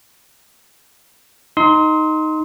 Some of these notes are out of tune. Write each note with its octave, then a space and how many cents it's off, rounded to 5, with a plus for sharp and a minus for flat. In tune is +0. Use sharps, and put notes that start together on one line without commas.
D#4 +0 C6 +0 D#6 +45